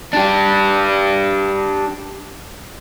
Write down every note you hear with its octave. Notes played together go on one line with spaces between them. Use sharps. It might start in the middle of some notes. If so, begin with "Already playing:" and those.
D4 G4